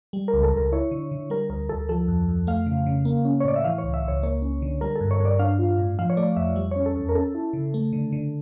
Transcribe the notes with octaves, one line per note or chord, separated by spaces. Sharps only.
G3
A#4
C#2
A4
C#2 A#4
E4 C#5
D3
D3
G3 A#4
D2 A#4
D2 A4
F3 A4
F2
F2
A3 F5
C#3
C#3
A#3
C#4
C#5
A2 D5
E5
E3 F5
C#2 C#5
E5
C#2 C#5
A#3 C#5
C#4
D3
G3 A#4
A4
G2
C#5
G2
D5
D4 F5
F4
A2
F3 F5
C#5
A3 D5
F2 E5
G3
C#4 C#5
A4
E2
A#4
C#4 A4
E4
C#3
A3
D3
D3